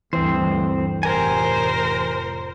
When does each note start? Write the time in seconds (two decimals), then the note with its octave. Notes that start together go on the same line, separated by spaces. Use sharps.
0.13 D2 G2 E3 C4 C5
1.03 F1 A2 G4 A#4 C5 G#5